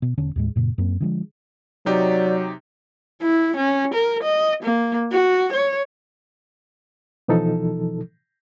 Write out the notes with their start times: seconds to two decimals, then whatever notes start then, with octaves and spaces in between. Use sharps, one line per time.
0.02 B2
0.17 E1 D3 C#4 D4
0.36 D#2 A2 G#3
0.56 F#2 A#2 C#3
0.78 F#2 A#3 C4
1.00 D3 F3 G#3
1.86 C3 F#3 D#4 G4 D5
3.22 E4
3.57 C#4
3.94 A#4
4.23 D#5
4.63 A#3
5.12 F#4
5.53 C#5
7.28 B2 E3 F3 D#4 A4